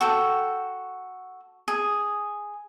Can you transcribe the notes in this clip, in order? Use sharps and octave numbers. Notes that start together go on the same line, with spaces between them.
F#4 A4 G5
G#4